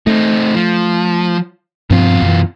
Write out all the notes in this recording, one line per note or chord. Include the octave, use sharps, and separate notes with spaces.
A3 C4 D#4
F3
G2 B2 F3 C4 F4
F#2 E3